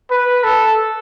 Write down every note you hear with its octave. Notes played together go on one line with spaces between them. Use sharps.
B4
A4